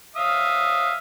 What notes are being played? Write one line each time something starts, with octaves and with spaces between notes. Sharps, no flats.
E5 F5 D#6